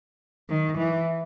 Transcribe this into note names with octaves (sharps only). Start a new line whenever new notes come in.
D#3
E3